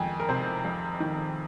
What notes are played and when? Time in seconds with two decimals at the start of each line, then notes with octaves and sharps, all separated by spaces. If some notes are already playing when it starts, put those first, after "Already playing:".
Already playing: F2 D#3 G5 G#5
0.20 A#4
0.29 C3 C5
0.65 F2
1.00 D#3